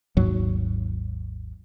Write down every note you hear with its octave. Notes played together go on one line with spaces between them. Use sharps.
G#1 D#2 G#2 F#3